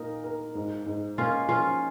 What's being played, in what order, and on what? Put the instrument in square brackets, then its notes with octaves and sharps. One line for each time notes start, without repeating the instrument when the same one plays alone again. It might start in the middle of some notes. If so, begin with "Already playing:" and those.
Already playing: [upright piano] A#2 A#4 [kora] D#4
[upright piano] A#4
G#2
G#2
[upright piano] A#3 [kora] C#4 F4
[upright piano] F3 [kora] C#4 F4